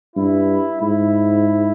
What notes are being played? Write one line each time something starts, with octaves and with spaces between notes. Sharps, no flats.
G2 E4
G#2 E4